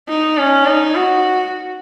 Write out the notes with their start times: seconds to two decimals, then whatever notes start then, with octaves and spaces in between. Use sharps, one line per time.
0.09 D#4
0.38 C#4
0.67 D#4
0.95 F#4